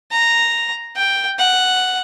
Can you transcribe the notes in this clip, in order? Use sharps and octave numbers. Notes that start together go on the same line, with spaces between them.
A#5
G5
F#5